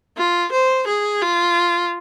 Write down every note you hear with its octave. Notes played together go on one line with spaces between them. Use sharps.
F4
C5
G#4
F4